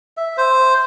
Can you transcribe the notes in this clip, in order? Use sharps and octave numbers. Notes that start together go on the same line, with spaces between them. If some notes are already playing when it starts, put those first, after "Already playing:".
E5
C5